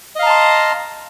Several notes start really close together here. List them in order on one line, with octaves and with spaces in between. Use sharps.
D#5 F5 A#5 A5 C6